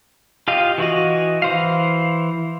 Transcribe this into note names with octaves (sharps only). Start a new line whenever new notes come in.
F4 G4 D#5 F5
E3 F#4 D#5
E3 C5 F5